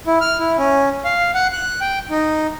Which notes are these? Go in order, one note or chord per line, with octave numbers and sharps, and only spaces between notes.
E4
F6
E4
C#4
F5
F#5
F#6
G5
D#4